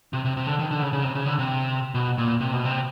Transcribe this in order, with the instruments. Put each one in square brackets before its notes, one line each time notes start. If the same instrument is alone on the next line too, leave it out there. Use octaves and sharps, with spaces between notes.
[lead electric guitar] C3
C3
C3
D3
D#3
D3
C#3
C#3
C3
C#3
D3
C3
B2
A#2
C3
B2
C3